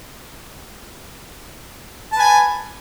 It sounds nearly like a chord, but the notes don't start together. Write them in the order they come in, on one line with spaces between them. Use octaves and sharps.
A5 B4 G#5